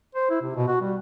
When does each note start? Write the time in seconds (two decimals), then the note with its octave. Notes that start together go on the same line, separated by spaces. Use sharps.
0.15 C5
0.30 E4
0.42 C3
0.55 B2
0.68 F#4
0.81 G3